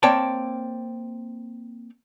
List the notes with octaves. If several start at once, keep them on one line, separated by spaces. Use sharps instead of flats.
A#3 C4 C#5 D5 G5 A5